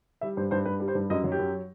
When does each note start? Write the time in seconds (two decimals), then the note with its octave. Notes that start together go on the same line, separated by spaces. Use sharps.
0.21 G3 E5
0.37 G2 C5
0.51 G2 C5
0.66 G2 B4
0.80 G3
0.88 C5
0.95 G2
1.10 F#2 D#5
1.24 F#3
1.32 G4
1.39 F#2